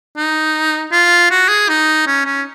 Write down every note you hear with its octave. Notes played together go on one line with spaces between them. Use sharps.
D#4
F4
F#4
G#4
D#4
C#4
C#4